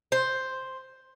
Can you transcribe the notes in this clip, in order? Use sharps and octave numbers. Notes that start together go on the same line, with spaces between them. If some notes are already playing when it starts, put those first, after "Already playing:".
C5